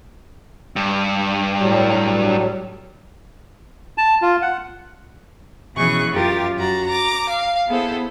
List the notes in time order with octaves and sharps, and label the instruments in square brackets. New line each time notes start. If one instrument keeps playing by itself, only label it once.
[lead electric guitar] G2
[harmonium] A2 F#3 G3
[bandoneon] A5
F4
F#5
[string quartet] B2 E3 C#4 G#4 C#6 F#6
F#2 F4 G4 A#4 A6
F#2 F#4 A#5 A6
A#5 D6
F5
B3 E4 G#4 A4 C5